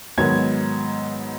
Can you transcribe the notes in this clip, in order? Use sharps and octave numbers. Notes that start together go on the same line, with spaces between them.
G#2 D#3 F#3 B3 G#6